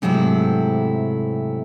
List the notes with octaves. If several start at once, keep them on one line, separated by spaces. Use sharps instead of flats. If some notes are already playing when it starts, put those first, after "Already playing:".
G#2 C3 F#3 A3 E4